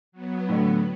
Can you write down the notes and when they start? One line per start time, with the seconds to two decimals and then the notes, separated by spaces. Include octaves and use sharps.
0.12 F#3 B3
0.49 A2 D3